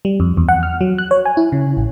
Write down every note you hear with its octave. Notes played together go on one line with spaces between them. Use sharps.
G3
F2
E2
F#5
F6
F#3
F#6
C#5
G#5
E4
C#3
A1